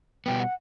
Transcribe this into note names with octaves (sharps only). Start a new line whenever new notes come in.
B2 G3 B3 G5
F#5